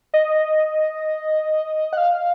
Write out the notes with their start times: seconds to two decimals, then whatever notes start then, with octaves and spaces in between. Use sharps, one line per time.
0.14 D#5
1.93 F#5
1.97 F5